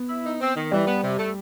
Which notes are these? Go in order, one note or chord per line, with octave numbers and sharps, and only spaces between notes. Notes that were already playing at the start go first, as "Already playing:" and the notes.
Already playing: B3
E4
D#4
C4
D#3
E3 G3
B3
C3
A3